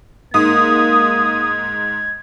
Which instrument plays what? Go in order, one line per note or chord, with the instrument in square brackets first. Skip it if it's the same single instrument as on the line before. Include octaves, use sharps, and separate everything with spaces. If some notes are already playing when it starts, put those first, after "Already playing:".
[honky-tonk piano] G#2 [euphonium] A#3 [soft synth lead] D#6 [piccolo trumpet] G#6